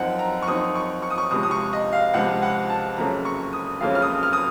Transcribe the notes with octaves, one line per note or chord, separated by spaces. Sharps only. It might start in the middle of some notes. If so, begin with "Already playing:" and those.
Already playing: F#2 F3 C4 D#4 F#5
A#5
C#6
F#2 F3 C4 D#4 D#6
C#6
C#6
D#6
C#6
C#2 C3 F3 C4 D#6
D#6
C#6
D#5
F5
C#2 C3 F3 C4 F#5
F#5
A5
F#1 F2 C#3 A3 C#4 A#5
C#6
D#6
F#1 F2 C#3 A3 C#4 F5
F6
D#6
F6
D#6